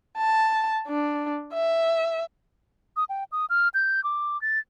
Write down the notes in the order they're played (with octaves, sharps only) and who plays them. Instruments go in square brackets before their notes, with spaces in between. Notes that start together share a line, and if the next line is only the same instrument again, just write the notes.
[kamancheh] A5
D4
E5
[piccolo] D#6
G5
D#6
F6
G6
D6
A6